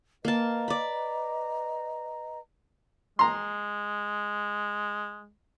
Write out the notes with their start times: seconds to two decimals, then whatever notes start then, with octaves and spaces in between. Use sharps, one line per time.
0.25 A#3 B4 D#5 A5 A#5
0.68 D5 B5
3.19 G#3 A#5 C6